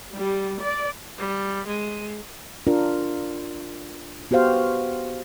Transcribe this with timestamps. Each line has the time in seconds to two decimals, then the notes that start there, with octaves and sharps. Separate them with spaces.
0.12 G3
0.60 D5
1.18 G3
1.67 G#3
2.67 D4 F4 A#4
4.31 B3 F#4 G4 C5 F5